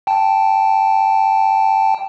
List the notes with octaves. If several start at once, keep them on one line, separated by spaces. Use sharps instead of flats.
G5 A5